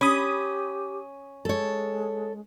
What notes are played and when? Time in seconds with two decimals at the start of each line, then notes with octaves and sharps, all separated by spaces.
0.01 C#4 G4 B5 D#6
1.45 G#3 A4 C#5